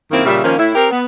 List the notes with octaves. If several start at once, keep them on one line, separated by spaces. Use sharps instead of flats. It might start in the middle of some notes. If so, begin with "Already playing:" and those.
F#2 D#3 A#3 C4 E4
A#2 C#3 G3 E5
D#3 F3 A#3 C#4
A2 E4
C4 G4 A#4
B3